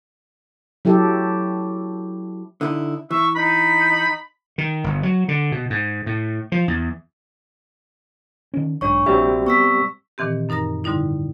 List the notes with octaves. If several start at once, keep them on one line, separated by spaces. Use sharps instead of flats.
F#3 E4 G4 A4
D3 D#4 E4
E3 E5 C#6
D#4 B5
D#3
G1
F#3
D3
B2
G#2
A2
F3
E2
D#3 C#4
B1 G#2 D4 C#5 C#6
A#1 G3 C4 F#4 E5
B3 C#6 E6 B6
A#2 D#3 E3 C4 G4
F#2 D#4 A#4 A#5 A#6
G#2 D3 G3 D#4 E4